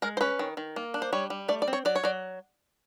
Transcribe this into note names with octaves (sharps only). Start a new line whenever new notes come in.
G#3 A#4
C5
C#4 B4
D#3
D#3
A#3
D4
C5
G3 C#5
G3
A3 D5
D5
C4
C#5
F#3 D5
C#5
F#3 D5